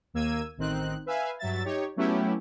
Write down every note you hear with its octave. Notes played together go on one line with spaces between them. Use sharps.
D#2 A#3 E6 G#6 D#7
A1 D#3 C4 D#4 F#6
B4 E5 F5 G#5
G2 F#3 E5 A6
D#4 G4 C#5
F#3 A3 B3 C#4 E4 G4